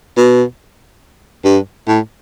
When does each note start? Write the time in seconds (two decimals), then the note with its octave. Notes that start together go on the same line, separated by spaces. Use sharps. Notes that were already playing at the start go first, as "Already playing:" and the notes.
0.17 B2
1.45 G2
1.88 A2